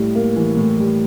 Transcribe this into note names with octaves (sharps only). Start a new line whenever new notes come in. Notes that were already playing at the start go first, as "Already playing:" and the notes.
Already playing: A2 G3
A#3
E3
A2
G3